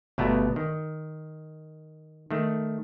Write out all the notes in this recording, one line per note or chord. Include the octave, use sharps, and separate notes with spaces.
G1 B2 A3 B3 D5 A#5
D#3
D#3 A3